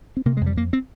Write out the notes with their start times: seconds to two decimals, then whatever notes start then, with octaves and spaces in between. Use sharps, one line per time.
0.17 C4
0.26 C3 A#3
0.37 G#3
0.41 F2
0.46 G3
0.56 F2 A#3
0.73 C4